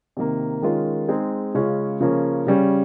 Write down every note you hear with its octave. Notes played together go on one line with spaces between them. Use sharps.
C3 D#3 A#3
D#3 G#3 C#4 F4 A#4
G#3 C4 D#4 G#4
C#3 G#3 C#4 F4
C#3 F3 A#3 C#4
C#3 G3 C#4